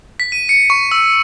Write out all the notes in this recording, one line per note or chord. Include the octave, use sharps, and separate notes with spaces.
B6
D#7
C#7
C#6
E6